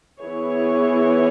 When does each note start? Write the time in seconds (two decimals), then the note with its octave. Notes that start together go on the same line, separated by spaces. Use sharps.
0.20 E3 B3 E4 G#4 C#5